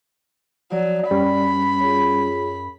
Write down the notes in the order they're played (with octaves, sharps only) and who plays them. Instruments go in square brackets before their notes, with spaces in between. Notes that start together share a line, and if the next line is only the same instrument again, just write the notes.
[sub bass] F3 [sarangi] F#3 [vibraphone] D5
[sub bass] F#2 [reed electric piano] G3 C#4 [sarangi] B5
[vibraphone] F4 G#4 C#5